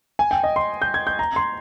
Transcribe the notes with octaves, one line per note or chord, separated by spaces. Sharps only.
G#5
G5
D#5
C6
G6
G#6
G6
A#5
C6